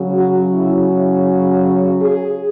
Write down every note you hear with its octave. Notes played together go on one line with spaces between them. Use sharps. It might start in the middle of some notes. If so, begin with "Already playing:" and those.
Already playing: C#3 F#3
F#4
E4
G#4